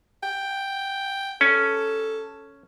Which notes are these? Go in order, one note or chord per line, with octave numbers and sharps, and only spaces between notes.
G5
C#4 A4